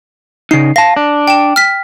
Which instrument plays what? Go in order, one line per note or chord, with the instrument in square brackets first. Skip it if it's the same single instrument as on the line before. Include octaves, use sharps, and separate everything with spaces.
[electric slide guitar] C#3 D#4 [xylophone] C7
[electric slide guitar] F5 A5 [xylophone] A#6
[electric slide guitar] D4
[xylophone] G5 E7
F6 B6